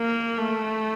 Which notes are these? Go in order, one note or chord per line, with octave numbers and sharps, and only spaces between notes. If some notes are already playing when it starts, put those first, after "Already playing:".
Already playing: A#3
A3